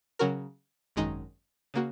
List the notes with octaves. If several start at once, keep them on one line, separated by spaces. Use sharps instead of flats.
C#3 F#3 C#4 F#4 A#4
G#1 F#2 D#3 G#3 D#4
C#3 A#3 F#4